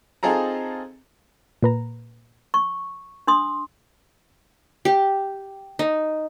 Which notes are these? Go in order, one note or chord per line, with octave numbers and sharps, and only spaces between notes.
C4 D#4 F4 G#4 A4 A#5
A#2 B4 A#5
C#6
D4 C6 D#6
G4
D#4